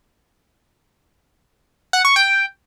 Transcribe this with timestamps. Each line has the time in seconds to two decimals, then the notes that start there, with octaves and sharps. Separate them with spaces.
1.93 F#5
2.05 C#6
2.16 G5